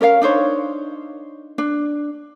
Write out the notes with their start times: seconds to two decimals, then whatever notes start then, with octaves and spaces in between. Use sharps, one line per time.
0.01 C#4 A#4 D5 F5
0.21 D4 D#4 C5 C#5
1.58 D4